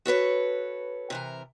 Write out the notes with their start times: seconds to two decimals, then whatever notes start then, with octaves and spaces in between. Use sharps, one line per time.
0.06 F#4 A4 B4 C#5
1.10 C3 E3 A#4